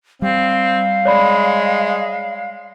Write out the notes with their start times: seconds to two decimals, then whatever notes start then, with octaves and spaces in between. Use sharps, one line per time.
0.22 G3 C4 F5
1.05 G#3 C#5 D5 B5